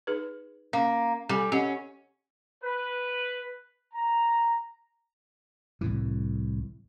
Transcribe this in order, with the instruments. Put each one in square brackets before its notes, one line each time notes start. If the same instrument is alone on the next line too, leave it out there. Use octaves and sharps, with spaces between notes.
[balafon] D#4 G#4 B4
[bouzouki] A#3 [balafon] C#4
[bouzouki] G3 [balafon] A4 G#5
[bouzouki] C#4 [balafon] G4 D#5 F#5
[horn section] B4
A#5
[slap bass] C2 A2 E3